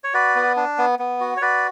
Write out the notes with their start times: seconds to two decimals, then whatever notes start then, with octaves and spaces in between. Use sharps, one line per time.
0.04 C#5
0.14 F#4 B4 D5
0.35 B3
0.56 D4
0.78 B3
0.99 B3
1.20 F#4
1.37 C#5
1.42 F#4 B4 D5